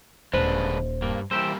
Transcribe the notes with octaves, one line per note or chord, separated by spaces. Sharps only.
D#1 D3 G#3 D4 B4 C5
G2 A#3
E3 G3 A#3 G4 C5 E6 E7